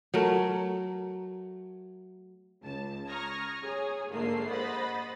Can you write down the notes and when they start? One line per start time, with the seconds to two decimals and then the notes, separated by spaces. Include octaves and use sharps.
0.14 F#3 A3 A#4
2.61 C#2 A5
3.07 A#5 C#6 D#6 F6 G#6 A#6
3.62 G#4 C#5 G#5 D#6
4.10 A#1 G#2 D3 A3 A#3 C7
4.49 C5 D#5 F#5 B5 A6